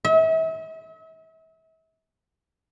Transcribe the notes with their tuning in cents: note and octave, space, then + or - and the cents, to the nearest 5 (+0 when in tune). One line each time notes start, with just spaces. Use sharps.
E5 -40